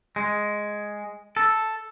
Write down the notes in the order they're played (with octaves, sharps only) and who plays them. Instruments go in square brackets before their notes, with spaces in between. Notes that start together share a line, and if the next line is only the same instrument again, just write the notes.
[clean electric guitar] G#3
A4